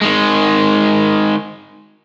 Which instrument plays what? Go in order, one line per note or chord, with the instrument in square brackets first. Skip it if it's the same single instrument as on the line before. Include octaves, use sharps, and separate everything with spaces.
[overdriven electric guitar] D#3 G#3